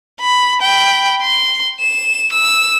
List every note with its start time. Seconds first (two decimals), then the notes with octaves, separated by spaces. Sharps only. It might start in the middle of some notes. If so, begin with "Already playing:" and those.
0.21 B5
0.62 G5 B5
1.22 C6
1.80 E7
2.32 E6